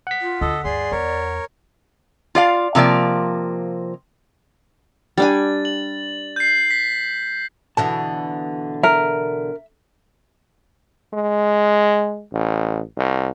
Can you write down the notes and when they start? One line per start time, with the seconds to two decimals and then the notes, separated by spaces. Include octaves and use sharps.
0.07 F#5 B6
0.21 F4
0.41 D2 A4 D#5
0.64 G2 G3 G#4 D5 C6
0.92 E2 A#4 C#5
2.35 F4 D5 F5
2.75 C3 F3 A#3 D5
5.18 G3 D4 G#5 A6
5.65 F#7
6.36 G6 C7
6.71 B6
7.77 B2 D3 E3 A5
8.83 A#4 E5
11.13 G#3
12.32 A1
12.97 C2